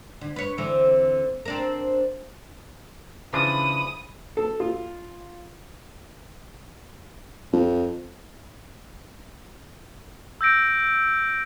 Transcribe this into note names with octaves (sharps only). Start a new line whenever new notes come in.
D3
B4 C#5
D3 E3 C4
C4 D4 A#4
C#3 E3 F3 D4 B5 D#6
A4
F4
F2
E6 G6 A#6 D7